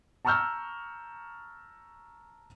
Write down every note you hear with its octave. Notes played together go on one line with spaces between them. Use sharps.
A5 A#5 C#6 E6 F6 G6